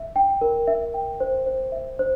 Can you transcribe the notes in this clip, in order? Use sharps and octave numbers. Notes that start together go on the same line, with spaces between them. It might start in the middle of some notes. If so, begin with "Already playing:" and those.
Already playing: E5
G5
A#4
E5
G5
C5
C5
E5
C5